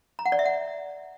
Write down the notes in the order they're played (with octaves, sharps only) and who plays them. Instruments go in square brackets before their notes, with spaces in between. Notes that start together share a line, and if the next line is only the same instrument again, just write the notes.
[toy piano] A#5
F#5
D5
E5
F#5